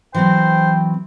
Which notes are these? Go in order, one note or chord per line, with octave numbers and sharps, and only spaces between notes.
E3 F#3 C4 C5 G5